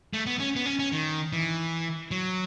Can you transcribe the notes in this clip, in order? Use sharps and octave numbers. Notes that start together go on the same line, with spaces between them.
A3
B3
C#4
B3
C#4
C#4
D#3
E3
F#3